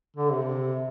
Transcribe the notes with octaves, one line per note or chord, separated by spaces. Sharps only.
D3
C3